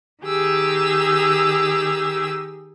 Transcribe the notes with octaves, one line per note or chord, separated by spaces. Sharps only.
D#3 G4 G#4 E6